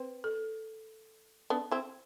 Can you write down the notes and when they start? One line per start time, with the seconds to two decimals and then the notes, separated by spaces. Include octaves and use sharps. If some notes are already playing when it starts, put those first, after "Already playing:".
Already playing: C4 B4
0.24 A4
1.50 B3 D4
1.71 C4 E4